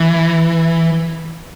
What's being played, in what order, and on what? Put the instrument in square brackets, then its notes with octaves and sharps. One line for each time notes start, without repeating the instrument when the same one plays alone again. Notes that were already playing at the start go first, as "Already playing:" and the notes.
Already playing: [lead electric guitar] E3